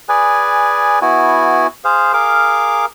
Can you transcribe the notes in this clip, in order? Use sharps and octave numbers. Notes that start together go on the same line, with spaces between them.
G#4 B4 D5 G#5
B3 E4 F#4 G#5
G#4 C5 F5
G#4 A#4 F5 D6